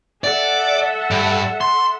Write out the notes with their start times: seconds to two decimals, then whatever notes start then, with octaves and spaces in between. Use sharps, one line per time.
0.24 A4 D5 E5 F#5
1.11 G2
1.61 C6